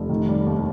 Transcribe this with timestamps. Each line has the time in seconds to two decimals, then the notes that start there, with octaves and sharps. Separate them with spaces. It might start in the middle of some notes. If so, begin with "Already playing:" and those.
Already playing: F1
0.09 D#3
0.29 G3
0.46 D#2